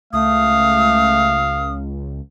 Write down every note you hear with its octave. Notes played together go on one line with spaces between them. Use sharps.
C#2 A3 F5 D#6